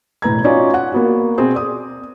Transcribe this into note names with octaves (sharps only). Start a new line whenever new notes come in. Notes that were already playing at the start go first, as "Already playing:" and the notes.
E1 A2 B4 A#5 G#6
C#4 D#4 F4 F#4 D5
F#5
A#3 B3 F#4
B2 C4 G#4
D5 D#6